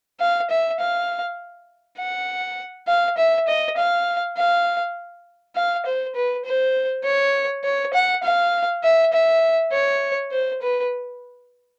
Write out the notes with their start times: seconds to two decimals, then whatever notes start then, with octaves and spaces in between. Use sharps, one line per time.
0.20 F5
0.50 E5
0.80 F5
1.99 F#5
2.88 F5
3.18 E5
3.48 D#5
3.77 F5
4.37 F5
5.56 F5
5.86 C5
6.15 B4
6.45 C5
7.04 C#5
7.64 C#5
7.94 F#5
8.23 F5
8.84 E5
9.13 E5
9.72 C#5
10.32 C5
10.62 B4